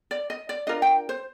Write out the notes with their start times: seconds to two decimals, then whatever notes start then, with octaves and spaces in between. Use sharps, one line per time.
0.11 D5
0.30 D#5
0.49 D5
0.67 D4 F4 A#4 D#5
0.82 G5
1.09 C5